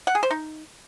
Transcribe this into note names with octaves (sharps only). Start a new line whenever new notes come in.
F#5
G#4
C5
D#4